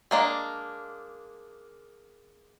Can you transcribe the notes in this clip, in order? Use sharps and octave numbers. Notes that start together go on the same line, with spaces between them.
G#3 A#3 D4